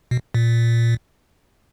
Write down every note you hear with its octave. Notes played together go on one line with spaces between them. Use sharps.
B2
A#2